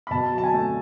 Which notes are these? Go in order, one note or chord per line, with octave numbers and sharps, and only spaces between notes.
B5
B2 A5
F#3
A5
G#5
A3